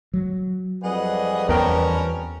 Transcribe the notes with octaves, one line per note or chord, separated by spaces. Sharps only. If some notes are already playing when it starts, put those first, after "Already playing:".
F#3
F2 G3 G#4 B4 D#5 F#5
E2 B3 C#4 A#4 G5 A5 A#5